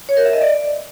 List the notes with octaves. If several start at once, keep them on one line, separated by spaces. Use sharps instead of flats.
C#5
A#4
E5
D#5
D5